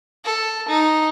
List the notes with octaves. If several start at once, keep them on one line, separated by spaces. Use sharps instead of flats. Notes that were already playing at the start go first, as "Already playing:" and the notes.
A4
D#4